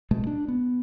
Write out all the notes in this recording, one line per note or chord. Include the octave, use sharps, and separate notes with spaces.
B2 G#3 A3
D4
B3